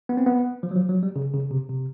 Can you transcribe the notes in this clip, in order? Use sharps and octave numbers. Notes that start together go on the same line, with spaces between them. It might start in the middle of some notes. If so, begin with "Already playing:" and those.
B3
C4
B3
F3
F#3
F3
F#3
G3
C#3
C#3
C3
C3